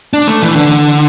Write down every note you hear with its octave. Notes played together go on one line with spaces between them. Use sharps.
D4
A3
E3
D3